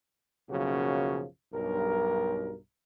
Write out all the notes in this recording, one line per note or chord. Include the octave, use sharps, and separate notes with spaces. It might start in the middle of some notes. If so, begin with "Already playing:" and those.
B1 F#2 C#3 F3 A#3 F#4
B1 G2 A#4